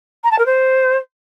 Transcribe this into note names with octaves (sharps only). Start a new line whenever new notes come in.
A#5
A5
A#4
C5